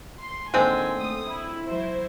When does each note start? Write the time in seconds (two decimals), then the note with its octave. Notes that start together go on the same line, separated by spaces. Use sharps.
0.21 C6
0.54 A#2 D3 D#3 G#3 C4 G#5
0.95 A3 D#6
1.29 E4
1.67 F#3 E4 C5